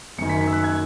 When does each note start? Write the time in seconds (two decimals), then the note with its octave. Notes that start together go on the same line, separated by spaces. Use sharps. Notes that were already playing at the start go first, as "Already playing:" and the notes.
0.18 F#1 F#2 D#3 C#7
0.29 B6
0.41 B6
0.48 E6
0.53 F#6
0.64 G#6